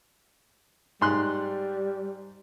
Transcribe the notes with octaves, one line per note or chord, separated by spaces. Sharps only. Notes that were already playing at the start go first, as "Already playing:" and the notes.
G#2 G3 C6 F#6